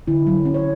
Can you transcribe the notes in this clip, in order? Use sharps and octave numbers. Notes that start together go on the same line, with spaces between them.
D3 E4
F#3
C#4
C#5